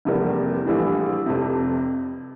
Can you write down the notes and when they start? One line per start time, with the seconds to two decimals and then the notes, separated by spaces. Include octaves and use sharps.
0.05 F1 E2 C3 G3 A#3
0.66 A#1 A2 E3 G3 D4
1.26 F1 F2 C3